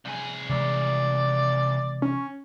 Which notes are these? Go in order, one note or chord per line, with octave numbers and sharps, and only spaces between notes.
C2 G#4
C3 E3 G#3 D5
C#4